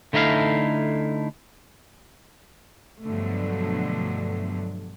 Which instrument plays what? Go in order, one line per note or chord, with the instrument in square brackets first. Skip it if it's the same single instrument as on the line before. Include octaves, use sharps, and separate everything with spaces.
[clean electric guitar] D3 A3 D#4 E4 F5
[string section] G2 B2 D3 F3 F#3 A3